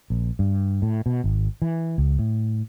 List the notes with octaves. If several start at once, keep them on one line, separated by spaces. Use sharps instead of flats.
A#1
G2
A2
B2
G#1
E3
C#2
A2